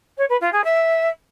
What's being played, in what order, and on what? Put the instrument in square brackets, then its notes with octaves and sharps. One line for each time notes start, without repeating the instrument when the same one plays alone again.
[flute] C#5
B4
F4
G#4
E5